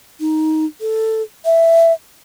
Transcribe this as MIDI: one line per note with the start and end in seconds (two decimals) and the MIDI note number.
0.20 0.65 63
0.81 1.22 69
1.45 1.93 76